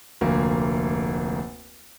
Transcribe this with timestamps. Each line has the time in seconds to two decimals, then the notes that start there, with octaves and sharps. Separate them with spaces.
0.21 F1 D2 A#3